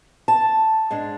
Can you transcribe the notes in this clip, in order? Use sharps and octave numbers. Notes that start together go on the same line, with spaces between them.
A5
G#2 G#3 D4